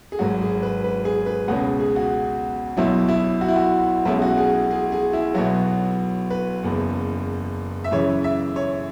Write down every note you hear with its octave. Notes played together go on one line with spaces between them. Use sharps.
G#4
G#1 G#2 F#3 F#4
G#4
B4
B4
G#4
B4
C#2 B2 G#3 C#4 F#5
G#4
F#4
B1 B2 F#3 E4
E4
F#4
E4
F#4
B1 B2 G#3 C#4 E4
F#4
G#4
G#4
G#4
E4
B1 B2 F#3 B3 F#4
B4
F#1 E2 C#3
E5
F#2 C#3 E3 C#5
E5
C#5